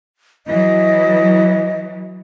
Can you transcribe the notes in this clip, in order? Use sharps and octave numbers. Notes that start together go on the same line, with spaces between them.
E3 F#3 D#5